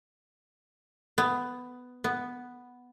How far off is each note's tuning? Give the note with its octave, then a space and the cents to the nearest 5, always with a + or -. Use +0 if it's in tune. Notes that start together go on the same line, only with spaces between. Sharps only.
B3 +10
B3 +0